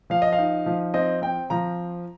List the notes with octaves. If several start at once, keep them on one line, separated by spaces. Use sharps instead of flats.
F3 F5
D#5
F5
D#4
F3
C4 D#5
C4 G5
F3 A#5